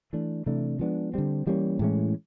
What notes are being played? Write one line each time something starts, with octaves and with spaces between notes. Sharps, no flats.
E3 A3 D4
C3 E3 A3 D4
F3 G#3 B3 D4
D3 G3 C4
E3 G3 A#3 C#4
A2 E3 G#3 C#4